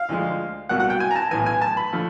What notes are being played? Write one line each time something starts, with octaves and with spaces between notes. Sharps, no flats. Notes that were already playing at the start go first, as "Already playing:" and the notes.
Already playing: F5
D2 D3 F3 G#3
C2 B2 F#3 A#3 F#5
F#5
G5
G#5
A#5
A5
B1 A2 E3 G#5
G#5
A5
B5
D3 F3 A3